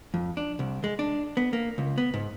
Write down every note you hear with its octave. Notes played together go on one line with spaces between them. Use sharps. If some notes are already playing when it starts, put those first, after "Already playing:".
F2
D4
C2
G#3
D4
B3
A#3
C#2
B3
G#2